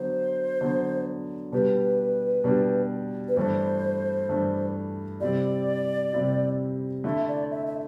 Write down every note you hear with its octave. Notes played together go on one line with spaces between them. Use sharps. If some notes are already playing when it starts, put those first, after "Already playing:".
Already playing: D3 F#3 B3 C5
D3 F#3 B3
B2 G3 D4 G4 B4
B2 G3 D4 G4
B4
G2 E3 A3 D4 C5
G2 E3 A3 D4
C3 G3 C4 E4 G4 D5
C3 G3 C4 E4 G4
D3 A3 E4 E5
D5
E5
E5